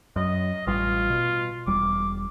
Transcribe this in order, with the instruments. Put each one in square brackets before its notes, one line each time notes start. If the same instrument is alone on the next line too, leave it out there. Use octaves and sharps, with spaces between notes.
[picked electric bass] F#2 [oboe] D#5
[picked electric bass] A1 G3 [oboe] F4
[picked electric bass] B2
[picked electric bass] E1 G3 [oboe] D6